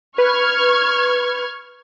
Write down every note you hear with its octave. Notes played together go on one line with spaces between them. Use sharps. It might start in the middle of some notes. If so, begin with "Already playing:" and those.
B4 C#6 F6 G#6